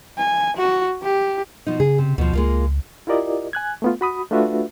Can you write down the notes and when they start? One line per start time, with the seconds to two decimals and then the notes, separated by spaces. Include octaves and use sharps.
0.18 G#5
0.57 F#4
1.02 G4
1.67 B2 F3 D#4
1.80 C#3 G#4
1.98 C3
2.18 D2 B2 F3
2.33 C#2 G#3 A#3 F4
3.07 E4 F4 G4 A#4 D5 D#5
3.53 G#5 F#6 G#6
3.82 A3 B3 F4
4.01 F#4 B5 D#6
4.31 A3 D4 F4 F#4 B4 E5